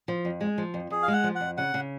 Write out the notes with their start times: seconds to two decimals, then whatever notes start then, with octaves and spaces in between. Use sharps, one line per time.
0.08 F3
0.25 F2
0.41 G#3
0.58 F3
0.74 F2
0.90 F2 G#4
1.03 F5
1.08 G#3 F#5
1.24 F3
1.35 F#5
1.41 F2
1.57 C#3 F#5
1.74 C#3